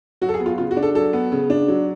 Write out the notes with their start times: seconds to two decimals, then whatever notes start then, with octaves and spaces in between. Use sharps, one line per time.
0.22 F#3 F#4
0.29 A4
0.34 G#4
0.40 B3
0.46 F4
0.58 C#3 F4
0.71 F#4
0.77 D4
0.83 A4
0.95 F#3 A4
1.13 B3
1.32 C#3
1.50 D4
1.68 F#3